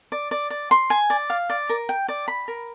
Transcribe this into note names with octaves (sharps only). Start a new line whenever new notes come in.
D5
D5
D5
C6
G#5
D5
F5
D5
A#4
G5
D5
B5
A#4